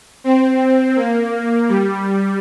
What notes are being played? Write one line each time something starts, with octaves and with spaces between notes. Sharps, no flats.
C4
A#3
G3